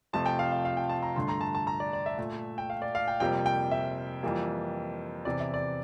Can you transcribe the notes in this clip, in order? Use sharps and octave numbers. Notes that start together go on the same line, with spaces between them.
F2 C3 F3 A3 A5
G5
F5
F5
F5
G5
A5
A#5
G2 D3 A3 C6
A#5
A5
A5
A#5
D5
D5
E5
A#2 A3
G5
F5
D5
F5
G5
F2 C3 G3 A#3 G5
G5
E5
F2 E3 G3 A#3
E2 C3 E3 D5
E5
D5